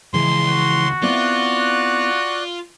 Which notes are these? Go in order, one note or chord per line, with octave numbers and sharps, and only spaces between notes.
C#2 E3 F3 G#3 C6
F#4
B3 C4 E4 F4 D5 F#6